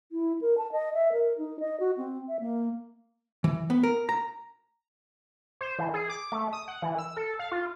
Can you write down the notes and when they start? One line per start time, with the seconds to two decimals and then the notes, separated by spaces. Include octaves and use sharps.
0.12 E4
0.41 A#4
0.58 A5
0.72 D#5
0.94 E5
1.12 A#4
1.38 D#4
1.60 D#5
1.80 F#4
1.98 C4
2.28 E5
2.40 A#3
3.44 E3
3.70 B3
3.83 A#4
4.09 A#5
5.61 C5
5.79 E3
5.94 G#4
6.10 D6
6.32 A3
6.53 D#6
6.68 F#5
6.82 E3
6.98 E6
7.17 A4
7.39 F5
7.52 F4